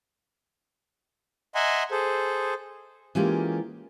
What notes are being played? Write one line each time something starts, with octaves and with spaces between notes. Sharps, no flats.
D#5 E5 F#5 G#5 A#5 C6
G#4 A4 C5
E3 G#3 A#3 C#4 F4 G4